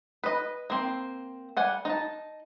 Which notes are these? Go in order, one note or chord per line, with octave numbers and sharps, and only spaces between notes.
B4 D#5
A#3 C4
G3 F#5 G#5
D#4 A5